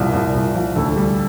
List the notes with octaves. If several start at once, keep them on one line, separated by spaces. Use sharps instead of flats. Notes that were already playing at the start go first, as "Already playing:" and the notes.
Already playing: C2 A#2 F3
C2
C2
F3
D2 A4
G3